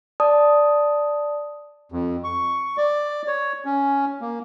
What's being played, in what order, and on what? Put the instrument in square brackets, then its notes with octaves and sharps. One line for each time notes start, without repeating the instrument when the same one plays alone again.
[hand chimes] D5 A5 D#6
[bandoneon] F2
C#6
D5
C#5
C#4
A#3